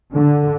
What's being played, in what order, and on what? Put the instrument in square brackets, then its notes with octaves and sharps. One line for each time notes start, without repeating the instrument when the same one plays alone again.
[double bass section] D3